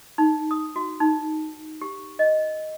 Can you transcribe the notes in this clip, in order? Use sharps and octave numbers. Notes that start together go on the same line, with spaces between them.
D#4
D#6
F#4
D#4
G4
D#5